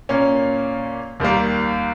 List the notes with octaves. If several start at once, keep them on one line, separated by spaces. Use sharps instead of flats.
A#2 A#3 C#4
D#2 D#3 G3 A#3